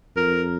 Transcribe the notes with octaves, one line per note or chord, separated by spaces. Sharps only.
F2 A#4